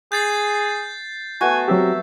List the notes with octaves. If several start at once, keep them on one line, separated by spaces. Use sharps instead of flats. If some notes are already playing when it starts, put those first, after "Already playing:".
G#4 G6 A6 C7
A3 B3 F#4 G#5
F#3 C4 G4 E5